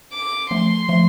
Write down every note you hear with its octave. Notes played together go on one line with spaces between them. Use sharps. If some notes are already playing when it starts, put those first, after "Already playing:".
D6
F3 A3 C6
F3 A3